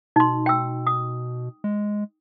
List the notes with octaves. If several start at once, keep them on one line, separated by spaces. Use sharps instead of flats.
B2 D#4 C6
G5 E6
D#6
G#3